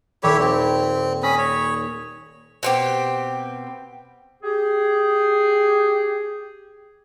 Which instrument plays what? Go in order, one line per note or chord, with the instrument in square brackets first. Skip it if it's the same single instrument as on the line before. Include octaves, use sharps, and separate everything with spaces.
[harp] D#1 [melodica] E4 G4 C#5
[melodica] C4
[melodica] C#4 B5 [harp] D#6 A#6
[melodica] C#5
[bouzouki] B2 C4 G4
[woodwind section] G4 G#4